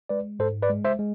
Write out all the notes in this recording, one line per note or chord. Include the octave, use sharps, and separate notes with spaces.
G#3 B4 D5
G#2 A4 C5
B4 D5
G#3
C5 E5
G#3